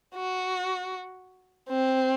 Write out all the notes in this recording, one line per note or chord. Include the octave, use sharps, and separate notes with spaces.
F#4
C4